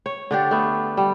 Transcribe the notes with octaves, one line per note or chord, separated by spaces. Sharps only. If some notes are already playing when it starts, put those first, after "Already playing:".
C#5
D3 D4 G4
A3 B3
G3